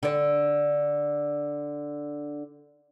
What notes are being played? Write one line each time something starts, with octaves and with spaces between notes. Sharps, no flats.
D3 D4